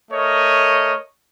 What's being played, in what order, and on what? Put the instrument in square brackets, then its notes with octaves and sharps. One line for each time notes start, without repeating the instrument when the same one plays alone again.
[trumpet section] A3 A#4 C#5 D#5